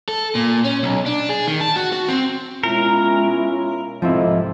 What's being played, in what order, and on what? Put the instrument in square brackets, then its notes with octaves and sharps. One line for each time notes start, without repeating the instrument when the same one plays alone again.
[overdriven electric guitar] A4
A#2
C#4
B1
D4
G#4
D#3
A5
F#4
F#4
C4
[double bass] B2 G#3 [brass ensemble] C#4 E4 F4 [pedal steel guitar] A#4
[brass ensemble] C2 A4 D#5 [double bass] G#2 C3 [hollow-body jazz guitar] F3 C4 E4